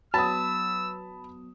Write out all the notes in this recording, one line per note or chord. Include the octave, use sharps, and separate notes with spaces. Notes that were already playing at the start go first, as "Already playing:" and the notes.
F#3 B3 A5 B5 D#6 E6